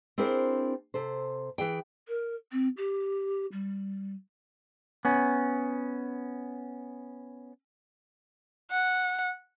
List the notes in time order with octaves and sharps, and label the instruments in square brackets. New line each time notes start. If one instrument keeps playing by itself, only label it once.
[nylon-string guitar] C4 D4 E4 G#4 A#4 C5
C3 A4 C5
E3 G#4 G5
[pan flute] A#4
C4
G4
G3
[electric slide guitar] B3 C#4
[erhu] F#5